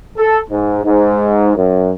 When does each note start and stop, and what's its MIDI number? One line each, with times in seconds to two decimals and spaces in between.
0.18 0.40 69
0.50 0.78 44
0.84 1.55 44
1.57 1.93 42